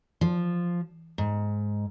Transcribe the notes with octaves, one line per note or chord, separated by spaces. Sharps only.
F3
G#2